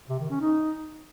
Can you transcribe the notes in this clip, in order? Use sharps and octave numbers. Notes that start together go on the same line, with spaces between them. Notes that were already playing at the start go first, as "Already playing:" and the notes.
C3
D#3
C#4
D#4